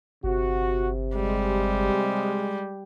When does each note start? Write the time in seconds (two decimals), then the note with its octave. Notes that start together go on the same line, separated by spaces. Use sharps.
0.24 G1 C3 F#4
1.16 G3 G#3